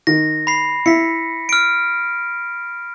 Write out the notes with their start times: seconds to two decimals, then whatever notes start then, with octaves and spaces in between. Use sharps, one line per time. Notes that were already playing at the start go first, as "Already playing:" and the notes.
0.07 D#3 A#6
0.47 B5 C7
0.86 E4 B6 C#7
1.49 F6 D7